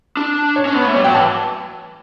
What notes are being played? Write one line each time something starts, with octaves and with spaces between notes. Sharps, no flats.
D4
C#5
C#4
B3
A3
G3 C#5
F#3 G5
E3 A5